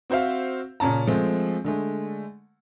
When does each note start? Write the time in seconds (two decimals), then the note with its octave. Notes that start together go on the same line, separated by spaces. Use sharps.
0.10 C4 F#4 C5 E5 F5
0.80 A#2 C#3 C#4 A5 A#5
1.07 F3 G#3 A3 C4
1.65 D3 G#3 A3